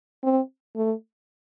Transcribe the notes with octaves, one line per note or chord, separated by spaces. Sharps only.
C4
A3